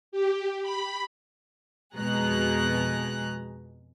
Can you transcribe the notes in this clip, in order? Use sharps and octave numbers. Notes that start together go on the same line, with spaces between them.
G4
B5
F2 B2 G#3 G#4 A#5 F#6